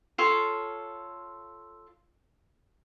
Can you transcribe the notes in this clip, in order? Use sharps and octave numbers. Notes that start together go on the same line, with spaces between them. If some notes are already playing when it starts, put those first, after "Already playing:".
F4 A4 C#5